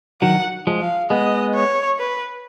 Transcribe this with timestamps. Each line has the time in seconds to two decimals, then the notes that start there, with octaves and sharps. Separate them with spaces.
0.22 D#3 F#3 F#5
0.67 F3 G#3
0.81 F5
1.10 G#3 B3 D#5
1.55 C#5
1.99 B4